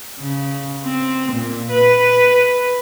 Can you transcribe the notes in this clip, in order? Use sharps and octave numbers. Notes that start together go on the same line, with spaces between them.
C#3
C4
A#2
B4